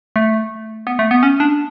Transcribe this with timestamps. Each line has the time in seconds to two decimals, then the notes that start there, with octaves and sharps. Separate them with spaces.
0.16 A3
0.87 B3
0.99 A3
1.11 B3
1.23 C#4
1.40 D4